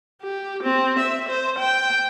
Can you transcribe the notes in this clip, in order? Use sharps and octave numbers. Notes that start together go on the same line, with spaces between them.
G4
C4
E5
C5
G5